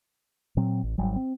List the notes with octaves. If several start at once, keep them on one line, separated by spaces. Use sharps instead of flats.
A#2 F#3 C4
A1
G#1 F#3 G3
C4